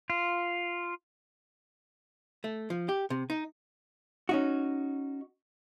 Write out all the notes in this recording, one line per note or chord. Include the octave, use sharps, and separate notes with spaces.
F4
A3
F3
G4
C3
D#4
C#4 D#4 F#4